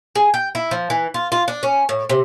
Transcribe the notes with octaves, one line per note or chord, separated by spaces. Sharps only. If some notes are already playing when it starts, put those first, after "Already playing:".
G#4
G5
E4
F3
E3
F4
F4
D4
C#4
A2
C3